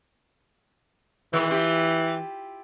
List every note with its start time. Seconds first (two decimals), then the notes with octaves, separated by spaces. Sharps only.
1.33 B2 D#3 E3 G#3
1.50 E4 F4 G4